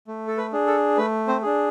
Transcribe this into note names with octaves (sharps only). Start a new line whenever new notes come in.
A3
A4
B4
D4 G#4
A4
A3 B4
C4 C5
D4 G#4